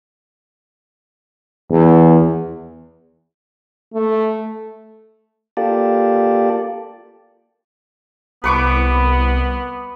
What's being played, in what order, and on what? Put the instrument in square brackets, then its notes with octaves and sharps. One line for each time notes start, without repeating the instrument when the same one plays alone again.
[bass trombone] E2
[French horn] A3
[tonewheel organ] A#3 F4 G4 A4 D5
[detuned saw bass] C2 [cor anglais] B3 [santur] B4 C#6 D6